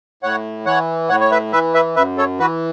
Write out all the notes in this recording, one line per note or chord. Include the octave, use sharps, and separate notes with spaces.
A2 C#5 F#5
E3 C#5 F#5
A2 C#5 F#5
C#5
B4 E5
E3 B4 E5
B4 E5
F#2 B4 E5
A4 C#5
E3 F#4 B4